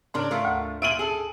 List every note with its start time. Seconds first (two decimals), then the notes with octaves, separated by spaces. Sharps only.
0.14 G#2 C#3 D4 A#4
0.31 A3 F4 A#4
0.45 D2
0.82 A#2 E5 D7 D#7 F#7
0.99 G#4 A4